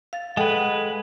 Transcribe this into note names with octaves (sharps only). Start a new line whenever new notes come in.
F5 A6
G#3 A4 B4 F#5 G5